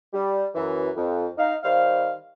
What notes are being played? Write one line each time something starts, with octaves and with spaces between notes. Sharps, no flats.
G3
F#2 E3
F2
D#4 F5
D#3 G3 C5 F5